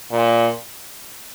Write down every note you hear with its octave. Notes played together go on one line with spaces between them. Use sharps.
A#2